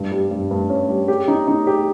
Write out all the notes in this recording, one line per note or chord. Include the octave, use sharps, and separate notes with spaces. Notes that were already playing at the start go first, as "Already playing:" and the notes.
Already playing: G2
G3
G2
G2
C#4
G3
G4
D#4
D#4
G4